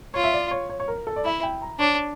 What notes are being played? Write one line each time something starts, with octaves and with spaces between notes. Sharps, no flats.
F4 C#5
E5
D5
C#5
C#5
C#5
A#4
A4
D5
E4 E5
G5
A#5
D4 C#5